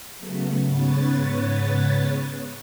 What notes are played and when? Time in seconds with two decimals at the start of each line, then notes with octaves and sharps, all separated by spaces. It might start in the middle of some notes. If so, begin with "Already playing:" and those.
0.18 C#3 F#3 A3 B3
0.66 G#2 C#3 B3 B4 C#5 A6